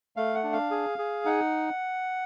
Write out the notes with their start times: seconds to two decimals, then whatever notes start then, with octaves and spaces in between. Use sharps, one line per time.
0.16 A3 F5
0.35 F#5
0.44 D4
0.53 F5
0.71 G#4
0.99 G#4
1.25 D#4 F#5